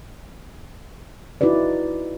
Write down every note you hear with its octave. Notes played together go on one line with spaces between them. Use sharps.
D#4 E4 F#4 B4 D5